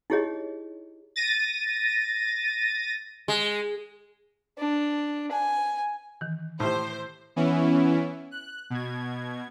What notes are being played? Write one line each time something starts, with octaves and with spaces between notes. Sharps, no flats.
D#4 E4 G4 G#4 C#5 D#5
A6 A#6 D#7
G#3
D4
G#5
D#3 E3
A2 G4 C5 E5 F6
E3 B3 C#4 E4
F#6
B2 G#6